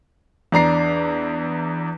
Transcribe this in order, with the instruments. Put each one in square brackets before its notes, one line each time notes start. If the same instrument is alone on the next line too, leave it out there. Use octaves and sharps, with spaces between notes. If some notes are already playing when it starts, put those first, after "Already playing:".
[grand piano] E2 D4 A#5 C7